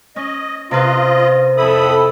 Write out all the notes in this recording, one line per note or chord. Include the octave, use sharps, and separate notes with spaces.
C#4 D#5
C3 F4 B4 D#5
F2 E4 A4 B5 D#6